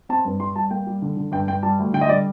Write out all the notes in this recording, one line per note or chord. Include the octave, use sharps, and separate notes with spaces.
C4 A5
G2
G3 C6
G3 A5
A#3 G5
G3
D3
D3
G2 G5
G2 G5
G3 A5
D2
D3 G5
D#5
G3 D5